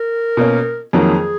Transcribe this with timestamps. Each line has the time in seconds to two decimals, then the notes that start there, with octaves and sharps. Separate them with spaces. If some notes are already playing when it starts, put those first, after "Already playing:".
Already playing: A#4
0.37 B2 A#3 C#4
0.93 F2 D#3 F#3 A#3 G#4